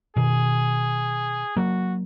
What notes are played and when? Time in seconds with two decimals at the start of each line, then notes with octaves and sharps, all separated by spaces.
0.16 B2 D#3 G#4
1.56 F#3 A#3 F#4